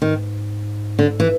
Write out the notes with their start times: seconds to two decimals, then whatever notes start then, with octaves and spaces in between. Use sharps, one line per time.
0.02 G#2 D#3
0.99 D3
1.20 E3